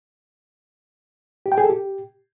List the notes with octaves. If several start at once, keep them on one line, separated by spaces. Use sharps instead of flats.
G4
G5
G#4
A4
G4